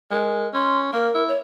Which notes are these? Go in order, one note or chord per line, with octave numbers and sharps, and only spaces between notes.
G#3 A#4
C#4 C6
A#3 A#4
E4
C#5